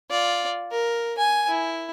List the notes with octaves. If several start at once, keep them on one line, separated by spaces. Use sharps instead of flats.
F4 D5
A#4
G#5
E4